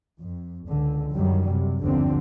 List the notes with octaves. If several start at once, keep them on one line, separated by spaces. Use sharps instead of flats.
F2
C#2 D3
F#2 D#3 F#3 G3
C3
G1 D#2 D3 F3 C4